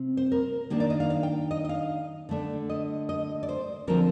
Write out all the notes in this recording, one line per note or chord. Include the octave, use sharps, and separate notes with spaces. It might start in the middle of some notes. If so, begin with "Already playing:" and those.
Already playing: C3 C4
C5
A#4
D#3 A#3 D4 G4
D5
D#5
F5
F5
G5
D#5
D#5
F5
D3 A3 D4
D#5
D#5
D5
C5
D3 F3 C4 A#4